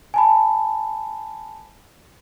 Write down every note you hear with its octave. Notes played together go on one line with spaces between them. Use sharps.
G#5 A5 B5